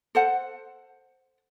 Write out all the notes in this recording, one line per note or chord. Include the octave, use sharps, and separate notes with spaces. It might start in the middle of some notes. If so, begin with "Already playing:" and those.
A4 C5 F#5